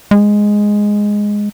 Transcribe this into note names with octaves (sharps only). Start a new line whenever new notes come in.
G#3